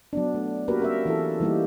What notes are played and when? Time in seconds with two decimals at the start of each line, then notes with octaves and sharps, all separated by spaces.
0.13 F#3 B3 D4
0.34 A3
0.68 A#3 F#4 G4 A#4 B4
0.80 C#4 A#4 E5
1.06 E3 E4 A4
1.40 E3 G3 A#3 D#4 G4